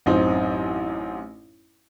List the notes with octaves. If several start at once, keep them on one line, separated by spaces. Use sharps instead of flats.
A1 F#2 C4 D#4